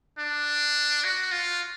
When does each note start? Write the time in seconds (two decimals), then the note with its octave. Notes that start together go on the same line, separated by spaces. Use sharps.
0.19 D4
1.05 F#4
1.32 F4